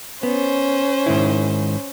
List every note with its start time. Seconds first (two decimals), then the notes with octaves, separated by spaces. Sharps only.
0.23 B3 C#4 C5
1.06 G#2 D#3 E4